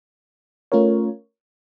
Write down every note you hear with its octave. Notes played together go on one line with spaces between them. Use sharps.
A3 C#4 F4 A#4 C#5